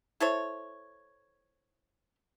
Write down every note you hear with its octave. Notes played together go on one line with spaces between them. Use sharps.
E4 A4 C5 C#5